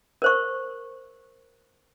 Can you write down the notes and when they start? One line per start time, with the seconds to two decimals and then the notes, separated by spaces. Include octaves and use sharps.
0.22 A#4 C5 C#6